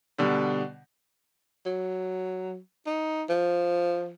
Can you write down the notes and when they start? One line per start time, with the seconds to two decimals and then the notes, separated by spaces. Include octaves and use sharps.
0.18 B2 D3 G3
1.66 F#3
2.87 D#4
3.29 F3